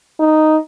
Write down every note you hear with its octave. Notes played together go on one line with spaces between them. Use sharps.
D#4